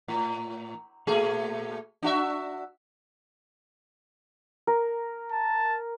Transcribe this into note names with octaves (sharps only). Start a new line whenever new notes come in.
A2
A#2 A3 G#4
D4 F#4 E5
A#4
A5